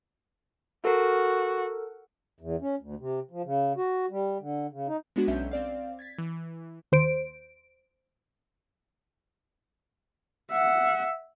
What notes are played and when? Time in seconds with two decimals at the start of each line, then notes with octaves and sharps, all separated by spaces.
0.85 F#4 A4 A#4
2.40 E2
2.61 C#4
2.81 D2
3.00 C3
3.31 F3
3.45 C#3
3.77 F#4
4.10 G3
4.40 D3
4.72 C#3
4.88 D#4
5.16 G#3 B3 D4 F#4
5.28 B1 C#4 D4 E5 G6
5.51 C4 D5 F5
5.99 G#6 A6 B6
6.18 E3
6.92 D#2 C5 D7
10.51 E5 F#5